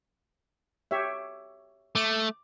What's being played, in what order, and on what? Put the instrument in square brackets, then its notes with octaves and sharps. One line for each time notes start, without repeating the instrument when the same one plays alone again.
[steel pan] G4 C#5 E5
[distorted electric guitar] A3 [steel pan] D6